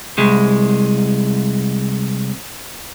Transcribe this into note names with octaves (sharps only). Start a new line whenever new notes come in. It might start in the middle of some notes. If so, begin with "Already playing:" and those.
C2 G#3